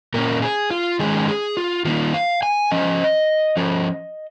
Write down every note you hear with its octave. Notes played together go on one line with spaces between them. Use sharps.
A#2 A#3 C#4 A#4
G#4
F4
D#3 G#3 C#4 G#4
G#4
F4
D#3 A#3 D#4 F4
F5
G#5
F3 C#4 D#5
F3 C#4